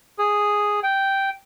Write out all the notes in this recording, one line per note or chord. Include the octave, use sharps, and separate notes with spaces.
G#4
G5